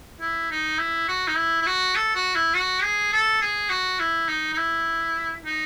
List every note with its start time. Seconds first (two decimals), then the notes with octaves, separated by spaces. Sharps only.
0.21 E4
0.51 D#4
0.79 E4
1.08 F#4
1.27 D#4
1.37 E4
1.61 E4
1.66 F#4
1.95 A4
2.15 F#4
2.35 E4
2.54 F#4
2.83 G#4
3.13 A4
3.41 G#4
3.70 F#4
3.99 E4
4.28 D#4
4.53 D#4
4.57 E4
5.45 D#4